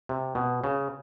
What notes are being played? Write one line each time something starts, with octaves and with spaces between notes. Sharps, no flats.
C3
B2
C#3